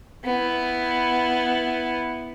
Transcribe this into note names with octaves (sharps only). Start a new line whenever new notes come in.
B3 E4